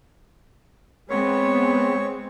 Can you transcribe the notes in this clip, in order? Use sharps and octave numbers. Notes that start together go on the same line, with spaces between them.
G#3 B3 C4 C#5